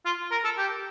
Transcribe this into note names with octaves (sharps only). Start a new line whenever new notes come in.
F4
A#4
A4
G4